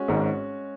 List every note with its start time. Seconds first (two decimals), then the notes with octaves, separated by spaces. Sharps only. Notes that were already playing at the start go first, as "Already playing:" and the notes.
Already playing: G#3 C#4 F#4
0.08 G#1 G#2